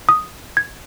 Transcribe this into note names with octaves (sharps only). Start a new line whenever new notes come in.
D#6
G#6